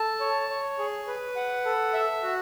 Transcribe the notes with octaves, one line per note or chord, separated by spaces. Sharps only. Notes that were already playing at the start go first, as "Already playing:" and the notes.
Already playing: A4 A5
C#5
C#5
G#4
B4
F#5
A4
E5
F#4